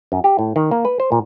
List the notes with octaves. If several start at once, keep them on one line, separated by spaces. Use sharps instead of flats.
F#2
G4
A2
D#3
A#3
B4
C5
A#2